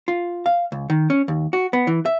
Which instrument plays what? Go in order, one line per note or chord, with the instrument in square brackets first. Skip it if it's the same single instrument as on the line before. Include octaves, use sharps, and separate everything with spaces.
[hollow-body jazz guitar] F4
F5
C#2
D#3
C#4
D#2
F#4
B3
E3
E5